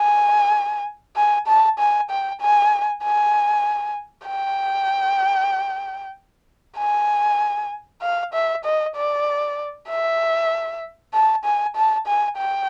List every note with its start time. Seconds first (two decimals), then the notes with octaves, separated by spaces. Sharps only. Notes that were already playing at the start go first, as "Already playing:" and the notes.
Already playing: G#5
1.16 G#5
1.47 A5
1.79 G#5
2.10 G5
2.41 G#5
3.03 G#5
4.27 G5
6.77 G#5
8.02 F5
8.33 E5
8.65 D#5
8.96 D5
9.89 E5
11.14 A5
11.45 G#5
11.76 A5
12.07 G#5
12.38 G5